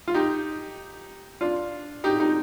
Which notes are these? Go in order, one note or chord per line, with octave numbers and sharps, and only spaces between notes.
F4
D#4 G4
D4 F4
D#4 G4
D#4 G4